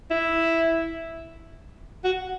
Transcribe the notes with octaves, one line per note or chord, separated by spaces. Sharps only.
E4
F#4